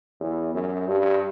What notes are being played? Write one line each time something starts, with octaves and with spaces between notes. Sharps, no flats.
E2
F#2
G2